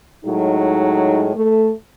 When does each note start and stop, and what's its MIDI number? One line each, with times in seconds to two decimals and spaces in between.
0.24 1.31 45
0.24 1.31 54
0.24 1.31 56
0.24 1.31 63
1.34 1.71 57